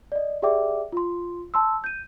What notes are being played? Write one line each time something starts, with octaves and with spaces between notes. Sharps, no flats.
D5 D#5
G4 G#4 D5 E5 G5 D6
F4 C6
A5 C6 E6
G6 D#7